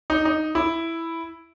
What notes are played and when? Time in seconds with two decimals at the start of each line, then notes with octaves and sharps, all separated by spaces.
0.10 D#4
0.25 D#4
0.55 E4